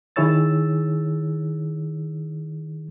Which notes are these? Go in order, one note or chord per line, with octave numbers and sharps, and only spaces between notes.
D#3 E4 G#4 C#5 E6 A6